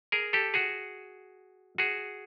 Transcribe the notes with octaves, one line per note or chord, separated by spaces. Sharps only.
G#4 A#4
G4 A4
F#4 G#4
F#4 G#4